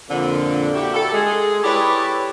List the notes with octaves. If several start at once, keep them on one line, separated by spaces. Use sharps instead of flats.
F2 A#2 D3
A#3 E4 F#4 G4
A4
G#3 G#4
E4 G4 A4 B4 C#5 D5